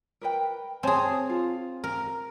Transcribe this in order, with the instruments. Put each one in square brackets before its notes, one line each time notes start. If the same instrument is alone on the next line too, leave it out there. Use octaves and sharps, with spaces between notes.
[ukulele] A#4 B4 G5
[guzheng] C4 G#4 [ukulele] C#5 G#5 A5
[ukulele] F4
[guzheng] A#4